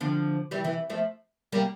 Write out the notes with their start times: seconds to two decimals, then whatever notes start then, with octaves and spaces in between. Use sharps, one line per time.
0.01 D3 F3
0.51 E3 G3
0.64 E3
0.90 F3 A3
1.52 G3 A#3